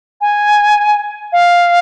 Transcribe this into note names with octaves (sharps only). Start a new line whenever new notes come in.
G#5
F5